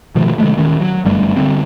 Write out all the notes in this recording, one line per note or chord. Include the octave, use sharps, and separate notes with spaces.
B2 D#3 F3 A3
D3 G#3 A3
D#1 D#3 C#4
F#3
G1 F#2 G3 A3
D3 D#3 G3 C4